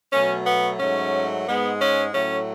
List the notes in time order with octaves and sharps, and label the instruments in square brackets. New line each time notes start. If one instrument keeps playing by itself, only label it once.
[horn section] B2 F#3 A3 C#4
B3
G#2 F#3 A3 C#4
G#2 G#3 B3
C#4
A2 F#3 A3 C#4